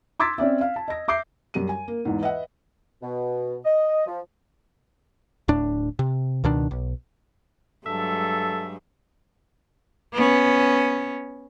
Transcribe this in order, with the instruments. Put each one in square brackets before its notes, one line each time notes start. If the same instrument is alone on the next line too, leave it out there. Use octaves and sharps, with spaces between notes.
[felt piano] C6 D6 E6 G#6 A6 B6
C4 C#4 D5 E5
F5
A5
D#5 A#6
E5 D6 G6 C7
F#2 G3 D#7
G#5
A#3
E2 G#2
B4 D#5 E5 F#5
[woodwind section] B2
D#5
F3
[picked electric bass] D1 A2 D4
C3
C#2 B2 D#3 D4
B1
[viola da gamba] G2 F#3 G#3 [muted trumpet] A4 [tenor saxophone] E5
[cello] B3 C#4